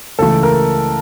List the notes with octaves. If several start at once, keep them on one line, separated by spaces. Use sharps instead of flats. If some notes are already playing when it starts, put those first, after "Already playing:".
C#2 C#3 E3 A3 A4
A#4